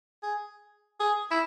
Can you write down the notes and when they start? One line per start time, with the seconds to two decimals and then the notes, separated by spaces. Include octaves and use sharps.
0.23 G#4
1.00 G#4
1.31 E4